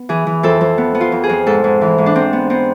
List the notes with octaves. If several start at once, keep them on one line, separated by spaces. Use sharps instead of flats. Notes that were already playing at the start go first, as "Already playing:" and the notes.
Already playing: B3
E3 G#4
E3
F2 A4
F2
B3
B3
F4
F2
G#4
F2
G#2 A4
G#2
E3
G#2
D4
G#2 C4
B3
B3 C4